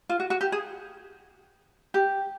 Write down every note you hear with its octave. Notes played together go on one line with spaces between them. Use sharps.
F4
F#4
F#4
G4
G#4
G4